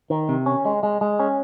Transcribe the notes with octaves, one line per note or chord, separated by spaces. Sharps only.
D#3
C3
C#4
G#3
G#3
G#3
C#4